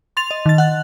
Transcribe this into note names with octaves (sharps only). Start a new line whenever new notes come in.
C6 A6 F7
D#5
D#3 A6
F#5 F#6